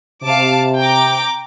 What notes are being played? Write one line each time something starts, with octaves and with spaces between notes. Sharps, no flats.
C3 F5 A5 D6
G5 A#5 D6